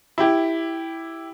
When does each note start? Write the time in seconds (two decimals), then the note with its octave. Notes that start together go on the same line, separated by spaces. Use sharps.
0.18 E4 G4